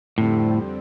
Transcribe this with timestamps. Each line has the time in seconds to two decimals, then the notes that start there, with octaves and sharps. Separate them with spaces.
0.18 F2 A2 D3 G3 C4